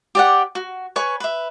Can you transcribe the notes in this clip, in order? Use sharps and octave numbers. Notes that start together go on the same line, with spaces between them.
G4 D5 F#5
F#4
B4 C#5 G#5 C#6
B4 E5